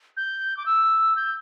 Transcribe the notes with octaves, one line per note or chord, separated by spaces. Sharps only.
G6
D6
E6
G6